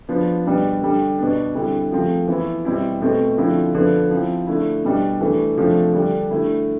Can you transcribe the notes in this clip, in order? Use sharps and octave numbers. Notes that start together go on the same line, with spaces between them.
F3 B3 D4
B2 G3 B3 D4
D3 G3 D4
B2 B3 D4
D3 G3 C4 E4
F3 A3 C4
E3 B3 E4
B2 G3 C4 E4
B2 A3 C4
D3 F3 C4 E4
D3 F3 B3
F3 C4 E4
D3 A3 E4
B2 G3 D4
E3 A3 D4
C3 F3 A3 D4
D3 G3 D4
D3 A3 E4